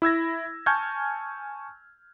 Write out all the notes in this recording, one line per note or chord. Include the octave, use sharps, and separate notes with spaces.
E4 E6 G#6 A#6
G#5 A5 C#6 F6 G6 G#6